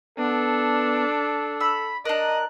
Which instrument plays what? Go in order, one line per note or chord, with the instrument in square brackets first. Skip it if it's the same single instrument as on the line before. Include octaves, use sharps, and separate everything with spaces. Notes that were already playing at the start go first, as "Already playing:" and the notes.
[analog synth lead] B3 [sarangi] D4 [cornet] A4
[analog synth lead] B5 [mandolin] E6
[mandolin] D4 A#4 [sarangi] D#5 [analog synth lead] F#6